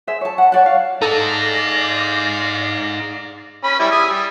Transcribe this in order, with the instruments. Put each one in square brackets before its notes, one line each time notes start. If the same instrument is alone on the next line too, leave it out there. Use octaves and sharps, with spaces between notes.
[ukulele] G#4 C5 E5
C#5 A5
F#5 A5
C#5 D5 F#5
F5
[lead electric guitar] D#4 G#4 [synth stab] A4 [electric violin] D5 F5 [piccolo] A#6
[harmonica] C#4 B5
G3 E4
E5 G#5 D#6
G3